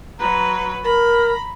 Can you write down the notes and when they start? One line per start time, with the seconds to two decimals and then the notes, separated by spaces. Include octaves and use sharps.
0.19 F#3 B4 A#5
0.84 A#4 A#5 B5